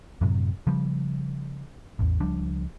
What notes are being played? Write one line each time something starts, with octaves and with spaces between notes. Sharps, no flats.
F#2 A2 C3 F#3
C#3 F3 G3
A1 E2
C#2 F3 G3 D4